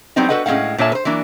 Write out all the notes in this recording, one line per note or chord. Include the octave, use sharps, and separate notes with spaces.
F#3 G3 B3 C4 D4 D#4
F#4 A4 B4 D#5 F#5
A2 G#3 C4 C#4 F5 F#5
A#2 D4 A4 C#5 E5 A5
B4 C5
E3 F#3 A#3 D4